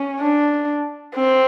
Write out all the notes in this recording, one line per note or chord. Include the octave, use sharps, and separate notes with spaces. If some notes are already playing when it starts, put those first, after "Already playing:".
Already playing: C#4
D4
C4